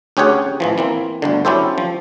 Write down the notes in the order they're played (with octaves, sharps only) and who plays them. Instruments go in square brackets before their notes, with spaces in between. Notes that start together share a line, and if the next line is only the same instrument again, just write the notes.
[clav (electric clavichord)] D2 C#4 G4 G#4 C#5 F#5
A1 E3 F3
E3 A#3 C4
G1 D2 D3
F#3 C#4 E4 G4 A4 C5
F3